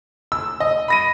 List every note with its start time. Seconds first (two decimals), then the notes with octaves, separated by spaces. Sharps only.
0.32 E6
0.60 D#5
0.88 B5 A#6 D#7